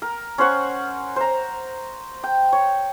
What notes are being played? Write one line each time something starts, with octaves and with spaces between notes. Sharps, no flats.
A#4
C#4 C5 F#5 C#6
C5 A#5
G5
C#5